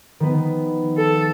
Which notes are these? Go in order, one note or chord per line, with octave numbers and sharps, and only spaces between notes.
D#3 F3 B3
A4